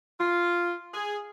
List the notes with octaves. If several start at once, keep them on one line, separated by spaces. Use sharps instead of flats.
F4
G#4